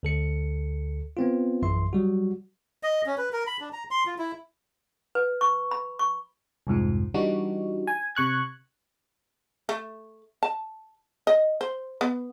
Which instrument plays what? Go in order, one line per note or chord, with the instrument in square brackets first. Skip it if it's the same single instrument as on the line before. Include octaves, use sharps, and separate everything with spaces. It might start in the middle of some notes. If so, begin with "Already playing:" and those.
[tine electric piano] D2 A4 C#7
B3 C4 F4
A#1 F#2 E3 E5 C6
F#3 G3 F#4
[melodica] D#5
C#4
B4
A#4
B5
D4
A#5
C6
F4
E4
[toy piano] B4
C#6
B5
C#6
[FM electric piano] C2 F2 G#2 F3
E3 G3 D4 D#4 F#4
G#5
C3 C#6 F#6 G#6
[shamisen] A3
A5
D#5
C5
B3